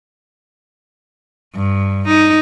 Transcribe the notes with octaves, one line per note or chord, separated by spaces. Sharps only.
G2
D#4